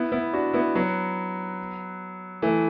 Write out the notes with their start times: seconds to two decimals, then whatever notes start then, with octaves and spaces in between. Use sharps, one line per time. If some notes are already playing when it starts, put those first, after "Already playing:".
Already playing: B3 E4
0.12 B3 E4
0.33 D4 F#4
0.53 B3 E4
0.75 F#3 B3
2.42 E3 A3